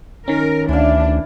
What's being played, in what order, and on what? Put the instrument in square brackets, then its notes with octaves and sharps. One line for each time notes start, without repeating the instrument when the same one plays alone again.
[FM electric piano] D#3 C#4 [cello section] A#4
[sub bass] D2 [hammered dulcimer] E3 F5 [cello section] D4